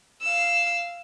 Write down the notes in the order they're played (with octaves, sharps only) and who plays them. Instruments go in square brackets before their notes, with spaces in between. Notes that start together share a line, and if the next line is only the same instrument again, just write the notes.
[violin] F5 E6